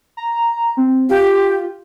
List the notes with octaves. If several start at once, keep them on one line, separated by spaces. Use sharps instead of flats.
A#5
C4
F4 G4